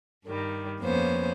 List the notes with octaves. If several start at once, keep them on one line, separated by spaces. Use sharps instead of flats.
G2 D#3 G3
F2 A#3 B3 C#4 C5